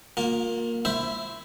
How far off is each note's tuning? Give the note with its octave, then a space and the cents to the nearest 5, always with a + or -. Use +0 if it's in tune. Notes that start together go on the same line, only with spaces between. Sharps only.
A#3 +0 F4 +30
E4 +15 C5 +0 E5 -5